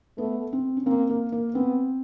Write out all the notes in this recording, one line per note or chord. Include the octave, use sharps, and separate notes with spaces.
A3 B3
C4
C#4
A#3 C4
A#3
A#3
B3 C4